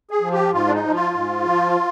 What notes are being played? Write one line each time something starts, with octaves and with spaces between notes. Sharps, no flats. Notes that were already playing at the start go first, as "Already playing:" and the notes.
G#4
F3
G4
G#2 F4
D4
D#4
F3
F4
G#2
F3